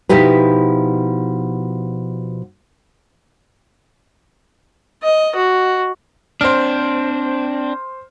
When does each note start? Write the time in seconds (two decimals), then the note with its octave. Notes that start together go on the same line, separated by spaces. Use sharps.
0.09 B2 F3 D#4 E4 G4 B4
5.03 D#5
5.35 F#4
6.41 C4 D4 C5 F6